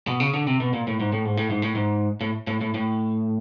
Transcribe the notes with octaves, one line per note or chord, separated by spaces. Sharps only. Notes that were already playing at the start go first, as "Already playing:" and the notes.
B2
C#3
D3
C3
B2
A#2
A2
G#2
A2
G#2
A2
G#2
A2
G#2
A2
A2
A2
A2